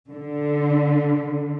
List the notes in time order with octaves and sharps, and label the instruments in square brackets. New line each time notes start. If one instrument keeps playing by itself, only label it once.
[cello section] D3